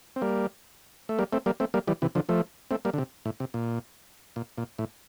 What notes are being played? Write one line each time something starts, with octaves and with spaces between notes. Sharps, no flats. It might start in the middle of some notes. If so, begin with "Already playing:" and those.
C4
G3 A#3
A3
G3 A#3
A3 C4
G3 A#3
A3 C4
G3 A#3
E3 G3
C3 E3
D3 F3
F3 A3
A3 C4
G3 A#3
D3
C3
A2
C3
A#2
A#2
A#2
A2